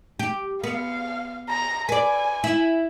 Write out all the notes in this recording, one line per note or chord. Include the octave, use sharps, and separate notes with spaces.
G4
B3 F5
A#5
B4 D5 G#5
E4